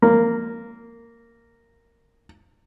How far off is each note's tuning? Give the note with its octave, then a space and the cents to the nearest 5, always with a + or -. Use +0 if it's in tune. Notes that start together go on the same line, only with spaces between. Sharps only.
A#3 -10